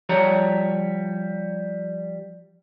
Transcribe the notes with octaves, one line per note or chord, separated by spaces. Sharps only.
F3 G3 C#5 A#5